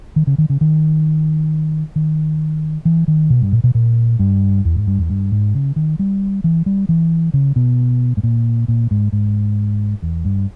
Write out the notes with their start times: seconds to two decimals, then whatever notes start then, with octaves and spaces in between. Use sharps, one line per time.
0.16 D#3
0.27 C#3
0.38 D#3
0.50 C#3
0.61 D#3
1.96 D#3
2.85 E3
3.08 D#3
3.30 B2
3.42 G2
3.52 A#2
3.64 B2
3.75 A#2
4.19 G2
4.65 E2
4.75 G#2
4.87 G2
4.98 E2
5.10 G2
5.32 G#2
5.55 C#3
5.76 D#3
5.99 G3
6.44 E3
6.66 G3
6.89 E3
7.34 C#3
7.56 B2
8.17 G#2
8.23 A#2
8.68 A#2
8.91 G#2
9.12 G#2
10.02 E2
10.25 G2